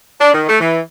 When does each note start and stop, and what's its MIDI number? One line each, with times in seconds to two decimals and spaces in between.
0.21 0.33 62
0.34 0.44 51
0.49 0.57 57
0.60 0.80 52